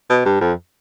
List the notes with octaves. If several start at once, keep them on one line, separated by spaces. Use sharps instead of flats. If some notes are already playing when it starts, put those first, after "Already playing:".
B2
G2
F2